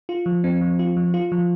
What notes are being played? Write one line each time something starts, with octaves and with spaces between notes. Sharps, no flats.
F4
F3
C4
F3
F4
F3
F4
F3